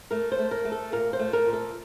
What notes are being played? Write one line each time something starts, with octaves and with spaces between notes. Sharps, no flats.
A3 A#4
C5
A3
A#4
A3
A4
A#2 A#4
C5
A3
A#4
A#2
A4